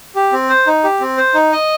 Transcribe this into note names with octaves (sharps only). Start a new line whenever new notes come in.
G4
C4
C5
D#4
G4
C4
C5
D#4
D#5